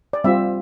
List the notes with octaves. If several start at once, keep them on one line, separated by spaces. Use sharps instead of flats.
D5
G3 C4 F4 E5